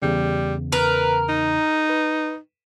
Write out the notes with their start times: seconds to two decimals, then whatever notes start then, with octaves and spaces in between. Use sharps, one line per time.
0.02 E2 C#3 G3
0.72 A#4 B4
1.29 D#4
1.90 B4